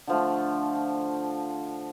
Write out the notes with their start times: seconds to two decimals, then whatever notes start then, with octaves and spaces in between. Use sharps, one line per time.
0.07 D3 F3 A3